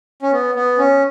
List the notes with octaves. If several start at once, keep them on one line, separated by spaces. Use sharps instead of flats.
C#4
B3
B3
C#4